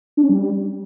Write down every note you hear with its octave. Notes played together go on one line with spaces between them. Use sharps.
D4
C#4
G3